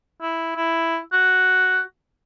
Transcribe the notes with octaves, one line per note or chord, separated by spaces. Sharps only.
E4
E4
F#4